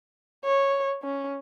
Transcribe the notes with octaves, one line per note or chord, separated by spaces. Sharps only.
C#5
C#4